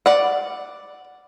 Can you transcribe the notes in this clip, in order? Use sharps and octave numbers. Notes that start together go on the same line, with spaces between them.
D5 F#5